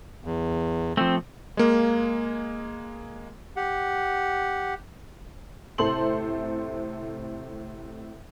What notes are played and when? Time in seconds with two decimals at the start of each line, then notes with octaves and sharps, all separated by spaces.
0.25 E2
0.97 F3 A3 C4
1.57 G#3 A#3
3.56 G4 F#5
5.78 A2 C3 A4 C5 C6 F#7